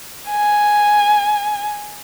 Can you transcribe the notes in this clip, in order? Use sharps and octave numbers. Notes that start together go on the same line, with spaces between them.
G#5